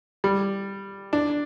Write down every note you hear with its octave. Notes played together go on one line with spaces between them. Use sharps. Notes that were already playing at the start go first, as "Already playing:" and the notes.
G3
D4